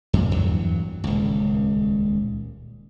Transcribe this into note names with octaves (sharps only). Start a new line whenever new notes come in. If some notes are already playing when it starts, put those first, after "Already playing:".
F2 A#2
E2 G2 F#3
D#1 C#2